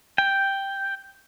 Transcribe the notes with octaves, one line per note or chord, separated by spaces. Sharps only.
G5